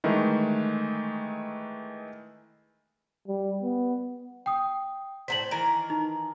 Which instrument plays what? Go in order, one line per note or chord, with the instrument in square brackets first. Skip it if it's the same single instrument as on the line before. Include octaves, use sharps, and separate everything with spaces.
[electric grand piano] D#3 E3 G#3 A3
[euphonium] G3
B3
[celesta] G5 D#6
[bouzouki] A2 C3 C5 [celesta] B6 F#7
[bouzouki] D#3 E3 A#4
[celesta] D#4